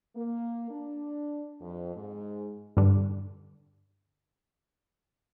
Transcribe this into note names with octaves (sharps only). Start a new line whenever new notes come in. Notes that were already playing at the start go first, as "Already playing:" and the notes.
A#3
D4
F2
G#2
G2 D3